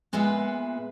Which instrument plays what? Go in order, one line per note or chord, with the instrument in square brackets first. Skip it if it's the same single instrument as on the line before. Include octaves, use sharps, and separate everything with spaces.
[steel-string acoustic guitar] A#2 G#3 B3 B4 E5